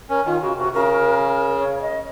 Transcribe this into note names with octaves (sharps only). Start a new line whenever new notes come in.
C#4 A#4
D#3 F4
C#3 F#4
C3 F#4
C#3 A#4
A#4
C#5
C#5
D#5